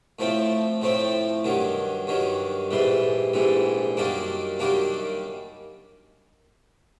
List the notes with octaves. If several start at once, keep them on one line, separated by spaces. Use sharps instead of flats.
A2 F3 A3 C4
A2 F3 A3 C4
G2 D#3 F#3
G2 D#3 F#3
A#1 G#2 E3 G3
A#1 G#2 E3 G3
F#2 D#3 G3 A#3 D4
F#2 D#3 G3 A#3 D4